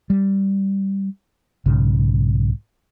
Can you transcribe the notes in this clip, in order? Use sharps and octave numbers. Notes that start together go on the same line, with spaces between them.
G3
B1 G#2 C#3